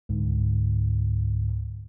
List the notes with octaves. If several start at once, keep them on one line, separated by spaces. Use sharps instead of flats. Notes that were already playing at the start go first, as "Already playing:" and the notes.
C#2 G#2 D3